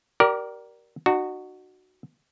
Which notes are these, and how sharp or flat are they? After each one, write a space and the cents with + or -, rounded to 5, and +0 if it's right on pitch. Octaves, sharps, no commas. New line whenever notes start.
G4 -35 A#4 +10 D5 +0
D#4 -45 F#4 +0